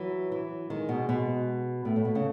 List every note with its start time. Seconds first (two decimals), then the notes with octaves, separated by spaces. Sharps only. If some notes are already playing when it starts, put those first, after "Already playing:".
Already playing: E3 F#3
0.32 E3
0.70 D#3 G#3
0.89 B2
1.09 B2
1.85 A2 A3
1.96 A2
2.05 B2
2.15 C#3